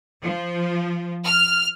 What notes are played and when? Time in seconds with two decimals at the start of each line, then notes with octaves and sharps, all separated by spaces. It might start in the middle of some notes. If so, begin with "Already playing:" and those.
0.23 F3
1.25 F6